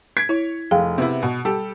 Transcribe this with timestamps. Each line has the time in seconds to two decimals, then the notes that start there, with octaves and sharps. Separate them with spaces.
0.17 G#6 B6 D7
0.29 E4 C#5
0.71 F1 G#4 F5 G5
0.98 C3 B3 E4
1.23 B2
1.45 G3 G4 A4